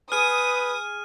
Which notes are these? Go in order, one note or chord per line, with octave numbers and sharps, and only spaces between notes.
G#4 B4 D#6 F6 D#7